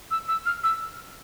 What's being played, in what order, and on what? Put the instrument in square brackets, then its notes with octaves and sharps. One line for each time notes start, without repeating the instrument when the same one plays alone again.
[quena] E6
E6
F6
E6